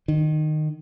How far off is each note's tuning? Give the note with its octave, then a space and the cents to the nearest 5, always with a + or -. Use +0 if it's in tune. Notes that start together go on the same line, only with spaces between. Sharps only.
D#3 -20